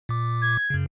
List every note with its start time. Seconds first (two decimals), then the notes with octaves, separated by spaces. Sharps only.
0.09 A#2 D6
0.42 G#6
0.70 F#2 C#3